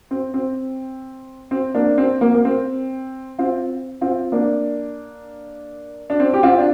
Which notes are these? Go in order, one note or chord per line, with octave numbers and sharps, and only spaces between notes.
C4
C4
C4
A#3 D4
C4
A#3
A#3
C4
C4 F4
C4 F4
A#3 D4
D4
C4
G4
C4 F4
D4